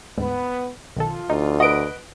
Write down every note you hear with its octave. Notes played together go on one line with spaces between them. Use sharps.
D2 G#2 B3
B1 D#3 F3 F4 A4
D2 D#4
F#4 B4 D#5 D7